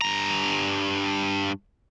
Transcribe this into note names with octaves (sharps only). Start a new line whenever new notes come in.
G2 A#5